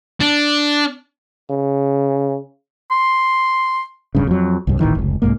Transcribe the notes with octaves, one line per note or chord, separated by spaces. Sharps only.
D4
C#3
C6
E1 G2 C#3
F2 F#3
C2 G2
D1 A1 D#3 E3
F1 C#2
C2 G#2 A#3